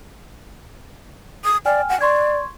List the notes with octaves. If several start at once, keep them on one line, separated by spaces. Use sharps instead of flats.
D#6
D5 G5 G#5 F6
F#5
D5 C6 C#6 G#6